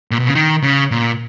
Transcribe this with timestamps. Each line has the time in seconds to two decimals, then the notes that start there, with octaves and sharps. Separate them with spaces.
0.11 A#2
0.20 B2
0.27 C#3
0.35 D#3
0.63 C#3
0.91 A#2